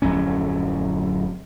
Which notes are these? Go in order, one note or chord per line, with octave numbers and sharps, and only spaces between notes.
D1 F2 F#3 C#4